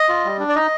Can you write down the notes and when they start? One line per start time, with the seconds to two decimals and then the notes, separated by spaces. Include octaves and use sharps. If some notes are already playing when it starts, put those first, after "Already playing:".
Already playing: D#5
0.09 F4
0.25 G3
0.40 D4
0.49 D5
0.55 D#4 D#5